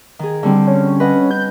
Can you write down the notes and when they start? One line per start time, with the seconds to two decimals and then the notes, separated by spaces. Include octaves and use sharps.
0.19 D#3 G#4
0.43 D3 G3 C4
0.67 C#4
1.00 B4 D#5 F#5
1.31 G6